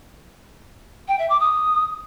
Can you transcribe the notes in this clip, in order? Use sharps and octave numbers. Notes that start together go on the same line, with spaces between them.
G5
E5
D6
D#6